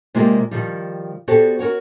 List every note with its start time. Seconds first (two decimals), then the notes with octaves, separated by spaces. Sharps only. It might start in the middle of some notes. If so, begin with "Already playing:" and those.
0.14 C3 G#3 A#3 F4 G4 D5
0.51 D#3 F3 G3
1.28 B3 F#4 G4 A4 C5 D5
1.59 F#4 A#4 C#5 F#5